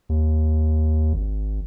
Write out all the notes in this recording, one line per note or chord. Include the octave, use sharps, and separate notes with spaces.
D#2
G#1